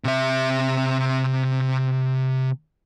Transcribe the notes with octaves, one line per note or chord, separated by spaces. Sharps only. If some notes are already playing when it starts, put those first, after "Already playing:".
C3 E5